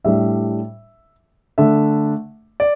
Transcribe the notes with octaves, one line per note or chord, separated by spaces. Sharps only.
A2 G3 D4 E5
D3 A3 D4 E5
D5